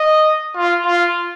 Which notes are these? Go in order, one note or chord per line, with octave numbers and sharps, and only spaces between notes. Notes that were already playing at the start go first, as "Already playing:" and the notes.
Already playing: D#5
F4
F4